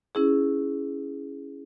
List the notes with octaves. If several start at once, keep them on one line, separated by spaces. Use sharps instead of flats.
C#4 E4 G#4